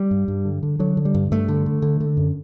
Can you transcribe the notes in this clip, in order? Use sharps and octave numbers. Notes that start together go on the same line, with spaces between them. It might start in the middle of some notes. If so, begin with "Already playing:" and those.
Already playing: G3
G2
G2
D3
D3
D3 F#3
D3
G3
G2
G2 A3
D3
D3
D3
D3
F#2